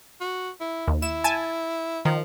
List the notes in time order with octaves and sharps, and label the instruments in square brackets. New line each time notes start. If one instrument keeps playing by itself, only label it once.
[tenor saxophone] F#4
E4
[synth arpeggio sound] D#2
[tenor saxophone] E4 [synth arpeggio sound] E7
[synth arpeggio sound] G#5 A5
[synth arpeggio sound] D#3 [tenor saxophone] F3